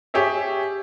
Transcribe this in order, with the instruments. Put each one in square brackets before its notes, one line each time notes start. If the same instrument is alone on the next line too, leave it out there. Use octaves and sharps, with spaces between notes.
[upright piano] G4 G#4 C#5 E5